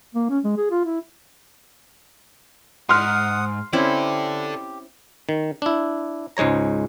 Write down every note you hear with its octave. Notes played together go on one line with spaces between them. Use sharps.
A#3
C#4
G#3
G#4
F4
E4
G#2 F#5 C6 D#6 F6
C4 C#4 E4 G4 A4 D5
D#3
D4 E4
C#2 G#2 G#3 C#5 A#5